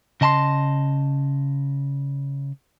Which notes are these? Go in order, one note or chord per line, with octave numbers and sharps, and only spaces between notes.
C#3 D#5 A5 B5 C6